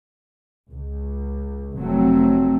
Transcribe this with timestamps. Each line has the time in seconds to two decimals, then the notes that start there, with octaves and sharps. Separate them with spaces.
0.69 C#2
1.81 F1 F#3 A3 C4